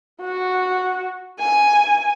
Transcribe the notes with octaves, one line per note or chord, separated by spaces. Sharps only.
F#4
G#5